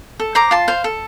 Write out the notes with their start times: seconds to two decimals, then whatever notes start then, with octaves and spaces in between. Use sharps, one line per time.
0.20 A4
0.35 C5 A#5 D6
0.51 F4 A5 C6
0.68 C5 F5
0.84 A4